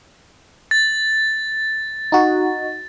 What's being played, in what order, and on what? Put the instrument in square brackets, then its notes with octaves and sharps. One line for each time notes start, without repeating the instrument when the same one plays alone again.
[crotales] A6
[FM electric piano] D#4 F#4